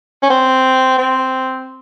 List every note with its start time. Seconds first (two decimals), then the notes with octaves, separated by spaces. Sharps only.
0.22 C#4
0.30 C4
0.98 C4